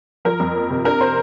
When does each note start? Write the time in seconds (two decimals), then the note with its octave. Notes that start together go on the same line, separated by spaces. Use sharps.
0.25 F3 A#4
0.40 F2
0.55 A#3
0.70 C3
0.85 D4 A#4
1.01 C5